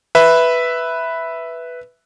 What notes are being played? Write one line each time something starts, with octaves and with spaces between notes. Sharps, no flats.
B4 E5 B5